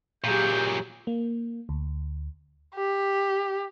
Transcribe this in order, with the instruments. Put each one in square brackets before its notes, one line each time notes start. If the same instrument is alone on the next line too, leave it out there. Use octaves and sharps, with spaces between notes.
[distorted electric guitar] A#2 F#3 [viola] G4 G#4 [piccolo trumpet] G6
[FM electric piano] A#3
D2
[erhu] G4